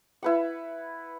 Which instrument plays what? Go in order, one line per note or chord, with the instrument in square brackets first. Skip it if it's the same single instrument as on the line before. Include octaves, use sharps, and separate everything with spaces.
[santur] E4 B4 F#5